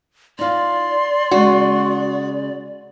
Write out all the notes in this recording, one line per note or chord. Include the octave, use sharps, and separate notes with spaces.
D#4 F4 D5 C6
C#3 G#3 F#4